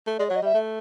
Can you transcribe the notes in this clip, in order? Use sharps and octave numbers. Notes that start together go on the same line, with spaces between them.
A3
G#3 D5
F#3 C#5
D#5
G3 E5
A3